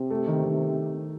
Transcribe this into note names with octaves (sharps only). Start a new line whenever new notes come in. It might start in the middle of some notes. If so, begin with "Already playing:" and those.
Already playing: C3
A3
D#3
D#3